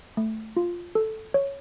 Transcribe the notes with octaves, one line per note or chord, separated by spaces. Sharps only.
A3
F4
A4
C#5